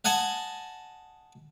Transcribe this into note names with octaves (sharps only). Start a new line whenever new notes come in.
D#5 F#5 G#5 A5